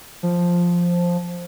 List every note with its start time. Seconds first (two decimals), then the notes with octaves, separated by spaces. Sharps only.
0.23 F3